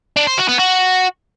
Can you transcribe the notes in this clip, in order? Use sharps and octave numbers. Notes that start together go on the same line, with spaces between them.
D4
C5
F#4
B3
F#4